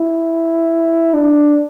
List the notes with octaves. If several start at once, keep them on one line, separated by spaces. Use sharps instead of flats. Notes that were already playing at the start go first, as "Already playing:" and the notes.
Already playing: E4
D4